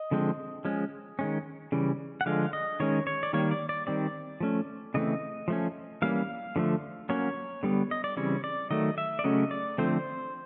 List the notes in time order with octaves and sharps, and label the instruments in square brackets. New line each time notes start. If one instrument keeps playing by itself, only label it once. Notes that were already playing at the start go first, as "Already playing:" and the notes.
Already playing: [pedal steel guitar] D#5
D3 F3 G#3 C4
F3 G#3 C#4
D#3 G#3 C#4
C#3 E3 G3
F#5
D3 F3 G#3 F5
D#5
D#3 G#3 C#4 C#5
C#5
D5
D#3 G3 A#3 C#5
D5
D5
D#3 G3 C4 D5
F3 A3 C#4
C#3 E3 A3 C4 D#5
F3 A3 C#4
E3 G3 A#3 C#4 F5
D3 F3 A3
F#3 A#3 C#4 C#5
D3 G3 B3
D#5
D5
C#3 E3 G3 C4 C#5
D5
D#3 F#3 A3 D#5
E5
D5
C#3 F#3 A3 C#4 D#5
D5
D3 F3 A3 C4 C5